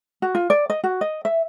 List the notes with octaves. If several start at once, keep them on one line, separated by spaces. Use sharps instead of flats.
F#4
F4
D5
D#5
F#4
D#5
E5